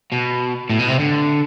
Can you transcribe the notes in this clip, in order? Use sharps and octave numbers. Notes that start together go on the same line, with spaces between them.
B2
A2
B2
C3
D3